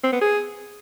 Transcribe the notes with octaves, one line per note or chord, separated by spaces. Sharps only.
C4
B3
G#4